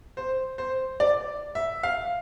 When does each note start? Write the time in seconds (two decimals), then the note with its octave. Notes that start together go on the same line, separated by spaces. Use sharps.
0.17 C5
0.58 C5
1.00 D5
1.55 E5
1.83 F5